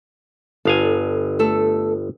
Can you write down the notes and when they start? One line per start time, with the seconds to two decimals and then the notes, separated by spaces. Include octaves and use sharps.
0.65 G1 A4 F5 G#5
1.39 A3 A4